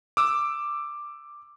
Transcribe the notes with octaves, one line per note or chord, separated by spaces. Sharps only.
D6 E6